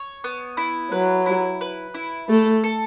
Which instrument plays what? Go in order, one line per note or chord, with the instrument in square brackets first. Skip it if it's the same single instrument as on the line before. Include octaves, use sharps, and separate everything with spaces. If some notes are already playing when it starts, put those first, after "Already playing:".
Already playing: [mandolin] C#5
B3
E4
[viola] F#3 [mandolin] B4
[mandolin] E4
B4
E4
[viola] A3 [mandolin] A4
[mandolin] A4